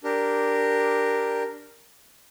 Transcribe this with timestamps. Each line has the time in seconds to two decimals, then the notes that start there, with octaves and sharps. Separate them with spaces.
0.04 D4 G4 A#4